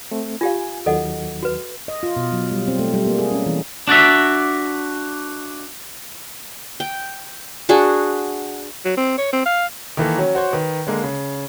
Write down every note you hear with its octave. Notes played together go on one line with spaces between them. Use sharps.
A3 C4
F4 G4 F5 G#5
D#2 D#3 F#3 A4 D#5 F#5
F#4 B4
D#5
F4
B2
F#3
G3
C4
A3
G3
A#3
G#4
C#4
E3
D4 F#4 D5 E5
G5
D4 F#4 G#4 F#5
F#3
C4
C#5
C4
F5
D#3 E3 A#3 A4
F#3 C#4
F#4 C5 C#5
D#3 B4
D3 G#3 A#3
C#3